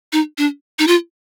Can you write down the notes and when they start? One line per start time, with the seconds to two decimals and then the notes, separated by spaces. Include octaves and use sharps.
0.13 D#4
0.38 D4
0.79 D#4
0.87 F4